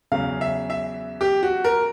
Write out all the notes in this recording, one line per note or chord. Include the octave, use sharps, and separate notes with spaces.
E2 C#3 F#3 F5
E5
E5
G4
F#4
A#4